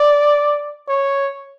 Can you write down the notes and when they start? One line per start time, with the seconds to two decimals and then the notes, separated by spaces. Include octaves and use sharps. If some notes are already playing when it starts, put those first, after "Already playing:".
Already playing: D5
0.88 C#5